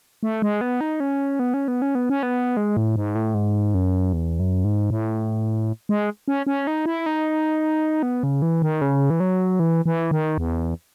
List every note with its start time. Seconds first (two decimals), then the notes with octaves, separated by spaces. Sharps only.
0.23 A3
0.42 G#3
0.61 B3
0.81 D#4
1.00 C#4
1.39 B3
1.54 C#4
1.68 B3
1.82 C#4
1.95 B3
2.09 C#4
2.23 B3
2.57 G#3
2.77 A2
2.96 G#2
3.15 A2
3.34 G#2
3.75 F#2
4.13 E2
4.40 F#2
4.65 G#2
4.90 A2
5.89 G#3
6.28 C#4
6.47 C#4
6.67 D#4
6.86 E4
7.06 D#4
8.03 B3
8.23 C#3
8.42 E3
8.62 D#3
8.82 C#3
9.10 E3
9.20 F#3
9.60 E3
9.86 E3
10.11 D#3
10.38 E2